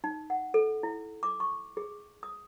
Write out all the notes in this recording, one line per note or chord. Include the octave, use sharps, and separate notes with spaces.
D#4
F#5
A4
E4
D6
C#6
G#4
D#6